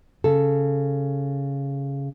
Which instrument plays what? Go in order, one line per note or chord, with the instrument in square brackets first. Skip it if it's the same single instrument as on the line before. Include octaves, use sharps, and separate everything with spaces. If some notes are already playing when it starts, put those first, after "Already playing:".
[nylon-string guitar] C#3 A4